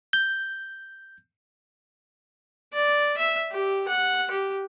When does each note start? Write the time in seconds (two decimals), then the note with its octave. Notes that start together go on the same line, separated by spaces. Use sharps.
0.13 G6
2.73 D5
3.18 E5
3.51 G4
3.88 F#5
4.31 G4